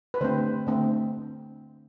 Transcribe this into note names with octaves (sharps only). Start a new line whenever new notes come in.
B4
D3 A3 C4 C5
D3 A3 C4